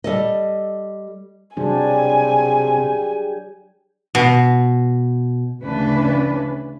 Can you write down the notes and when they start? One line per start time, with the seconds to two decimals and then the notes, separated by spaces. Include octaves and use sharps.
0.04 G3 A4 D#5
1.57 C3 F#3 G3 D4 G4 G#4 G#5
4.15 B2
5.63 D2 C#3 E3 C#4 D4 B4